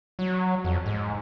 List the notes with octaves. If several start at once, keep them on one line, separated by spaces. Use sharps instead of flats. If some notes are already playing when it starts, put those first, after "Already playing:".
F#3
F2
G#2